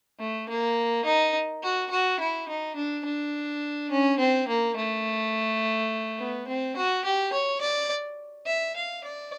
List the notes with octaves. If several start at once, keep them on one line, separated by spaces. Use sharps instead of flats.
A3
A#3
D#4
F#4
F#4
E4
D#4
D4
D4
C#4
C4
A#3
A3
B3
C4
F#4
G4
C#5
D5
E5
F5
D5